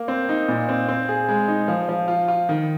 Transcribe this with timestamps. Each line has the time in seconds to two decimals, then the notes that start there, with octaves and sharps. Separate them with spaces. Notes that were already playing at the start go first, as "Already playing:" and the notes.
Already playing: A#3
0.08 C4
0.29 D#4
0.48 A#2
0.69 C4
0.88 C4
1.09 G#4
1.29 G#3
1.48 D#4
1.68 F3
1.89 F3
2.08 F4
2.28 F4
2.49 D#3